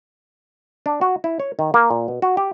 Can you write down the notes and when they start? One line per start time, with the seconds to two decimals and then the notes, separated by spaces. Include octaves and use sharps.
0.86 D4
1.01 F#4
1.24 E4
1.40 C#5
1.59 D#3
1.74 A#3
1.91 A#2
2.08 B2
2.22 F#4
2.37 G4